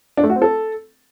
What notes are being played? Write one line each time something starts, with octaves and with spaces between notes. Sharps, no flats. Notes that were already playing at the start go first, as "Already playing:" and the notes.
D4
A3
F#4
C4
A4